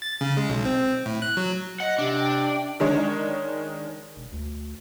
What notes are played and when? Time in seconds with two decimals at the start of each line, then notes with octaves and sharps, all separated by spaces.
0.02 A6
0.21 C#3
0.37 G#3
0.49 B1
0.65 C4
1.06 A2
1.22 F#6
1.37 F#3
1.80 D#5 F#5
1.99 C3 D4
2.20 G5
2.80 D#3 G#3 D4 C#5
4.16 E1
4.32 D2